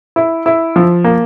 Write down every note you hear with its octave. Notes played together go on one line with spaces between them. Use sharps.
E4
E4
F3
A#3